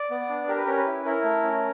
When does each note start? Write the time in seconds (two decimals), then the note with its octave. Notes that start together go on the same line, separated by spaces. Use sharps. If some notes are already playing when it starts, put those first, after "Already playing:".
Already playing: D5
0.11 B3
0.29 D4
0.48 G4 A#4
0.57 B4
0.66 C#4 A#4
0.77 B4
0.87 E4
1.05 E4 A#4
1.24 A3
1.43 C#4